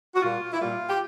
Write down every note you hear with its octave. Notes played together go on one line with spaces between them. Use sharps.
F#4
A#2 G3 A#3 F4
E4
A#2 G3 A#3 F4
G4